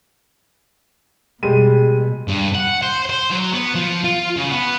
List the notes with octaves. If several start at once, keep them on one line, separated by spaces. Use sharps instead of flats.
B2 G3 G#3 D#7
G2
F#5
C5
C5
F#3
B3
F3
F4
C#3
B3